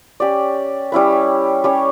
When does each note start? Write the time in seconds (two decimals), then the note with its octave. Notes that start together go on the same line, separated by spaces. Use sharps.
0.20 C#4 G4 D5
0.92 G3 C#4 E4 B4
1.64 G3 C#4 G4 C#5